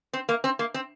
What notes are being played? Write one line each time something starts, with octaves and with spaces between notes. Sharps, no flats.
C4
A#3
C4
A#3
C4